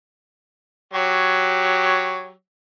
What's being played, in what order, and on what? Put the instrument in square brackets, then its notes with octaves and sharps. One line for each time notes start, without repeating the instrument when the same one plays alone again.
[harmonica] F#3 G4 C#5